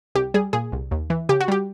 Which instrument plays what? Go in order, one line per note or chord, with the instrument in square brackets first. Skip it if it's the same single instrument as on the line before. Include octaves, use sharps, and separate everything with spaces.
[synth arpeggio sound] C2 G4
G3 G#4
A#2 G#4
C2
D#2
E3
C#3 G4
F#4
G3 G4